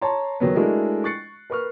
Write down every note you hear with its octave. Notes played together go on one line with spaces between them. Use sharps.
C#5 A5 A#5 C6
E2 D#3 F#3 B3
G#3 A3 D4 E4 F#4 A#4
C#6 F#6 A6 C7 C#7
A#4 B4 C#6 F6